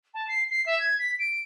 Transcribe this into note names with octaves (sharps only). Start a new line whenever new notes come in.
A5
C7
C7
E5
G#6
B6
D7